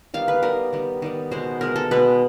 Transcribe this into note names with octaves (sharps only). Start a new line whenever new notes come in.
D#3 G3 B3 F5
B4
D#3 G3 B3 A#4
D#3 G3 B3
D#3 G3 B3
B2 G#3 B3 C5
B2 G#3 B3 A#4
A4
B2 G#3 B3 B4